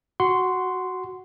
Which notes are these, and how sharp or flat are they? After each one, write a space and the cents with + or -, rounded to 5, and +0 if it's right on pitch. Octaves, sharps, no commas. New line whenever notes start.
F#4 +0 F#5 +0 C6 -10